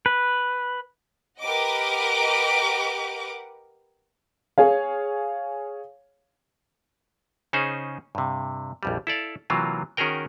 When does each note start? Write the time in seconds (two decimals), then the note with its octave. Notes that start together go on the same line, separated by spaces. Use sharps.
0.06 B4
1.40 G4 A#4 B4 D#5 F#5 D6
4.58 G#4 C#5 F5
7.53 C#3 C#4 D#4 G#4 C5
8.15 G2 C3
8.83 A#1 F2 G3
9.07 E4 A4 D5 F5
9.50 C3 E3 F#3 A#3 F4
9.97 D#3 C#4 F#4 G#4 A#4 G5